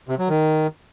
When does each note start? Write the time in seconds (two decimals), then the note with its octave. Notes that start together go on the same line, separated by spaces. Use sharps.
0.09 C3
0.19 F#3
0.29 D#3